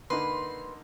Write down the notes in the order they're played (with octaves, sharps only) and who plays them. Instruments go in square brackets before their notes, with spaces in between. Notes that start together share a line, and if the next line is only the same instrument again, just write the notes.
[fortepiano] D3 A#3 D#4 [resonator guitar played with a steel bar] B4 [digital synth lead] C6